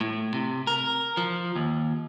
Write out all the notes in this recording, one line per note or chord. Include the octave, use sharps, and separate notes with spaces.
A2
C3
A#4
F3
D#2